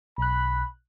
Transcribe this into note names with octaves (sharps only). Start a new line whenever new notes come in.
B1 B5 F#6